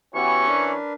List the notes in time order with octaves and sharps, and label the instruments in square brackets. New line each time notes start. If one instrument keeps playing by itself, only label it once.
[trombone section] E3 C#4 [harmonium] B3 F#4 G4 [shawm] C#6
[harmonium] D4 A#4 B4